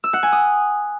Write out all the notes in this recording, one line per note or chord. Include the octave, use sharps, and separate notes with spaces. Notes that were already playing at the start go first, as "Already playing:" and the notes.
E6
F#5
G#5
D#6